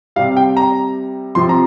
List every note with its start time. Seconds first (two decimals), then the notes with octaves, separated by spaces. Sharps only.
0.16 G3 F5
0.19 C3
0.37 G5
0.57 A#5
1.35 C3 F3 C6
1.49 A#5